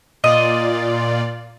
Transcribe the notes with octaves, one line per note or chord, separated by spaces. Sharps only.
A#2 F4 D5 D#5